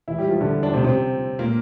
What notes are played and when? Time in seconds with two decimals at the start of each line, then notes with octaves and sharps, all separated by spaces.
0.08 E3 E4
0.18 G3 G4
0.29 F3 F4
0.41 D3 D4
0.63 D4
0.74 C3 C4
0.84 C3 C4
1.39 A#2 A#3